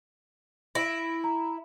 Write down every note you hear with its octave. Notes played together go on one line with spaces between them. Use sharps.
E4 A#6 D7
A#5